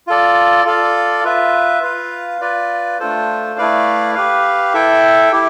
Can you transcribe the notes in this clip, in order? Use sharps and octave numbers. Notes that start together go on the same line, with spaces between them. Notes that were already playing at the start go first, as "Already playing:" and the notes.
F4 A4 D5
F4 A4 D5 F5
F4 B4 E5
F4 B4 F5
F4 B4 D5
A3 D4 F4 A4 C5
A3 E4 B4 D5 F5
G4 B4 F5
E4 A4 E5 G5
E4 G4